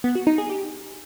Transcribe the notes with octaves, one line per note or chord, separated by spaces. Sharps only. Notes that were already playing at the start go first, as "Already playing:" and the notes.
B3
F#4
D#4
G#4
G4